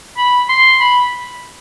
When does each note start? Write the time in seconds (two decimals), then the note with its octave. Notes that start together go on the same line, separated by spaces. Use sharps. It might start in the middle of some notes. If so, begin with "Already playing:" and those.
0.17 B5
0.49 C6
0.80 B5